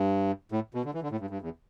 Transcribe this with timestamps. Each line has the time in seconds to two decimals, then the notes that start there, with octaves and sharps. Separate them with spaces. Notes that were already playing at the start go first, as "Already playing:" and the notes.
Already playing: G2
0.52 A2
0.74 B2
0.85 D3
0.94 E3
1.02 D3
1.11 A2
1.20 G2
1.30 G2
1.41 E2